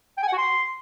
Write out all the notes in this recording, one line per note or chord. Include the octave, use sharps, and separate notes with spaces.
G5
G#5
F#5
F#4
C6